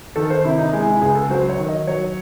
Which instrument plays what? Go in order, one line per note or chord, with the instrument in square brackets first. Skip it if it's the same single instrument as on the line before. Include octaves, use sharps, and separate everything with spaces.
[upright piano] D#3 A4
C5
C3 E4
D#4
G#3 E4
E4
C#2 G#4
A4
F#3 C5
C#5
D#3
D#5
F#3 C#5